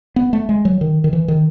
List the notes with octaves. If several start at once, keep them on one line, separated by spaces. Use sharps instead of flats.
B3
A3
G#3
F#3
D#3
D#3
E3
D#3